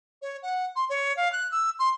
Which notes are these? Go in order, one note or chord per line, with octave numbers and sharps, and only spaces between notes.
C#5
F#5
C6
C#5
F5
F#6
E6
C6